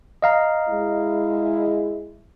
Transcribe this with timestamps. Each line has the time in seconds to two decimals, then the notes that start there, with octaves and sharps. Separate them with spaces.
0.22 D#5 F5 A#5
0.69 G#3 E4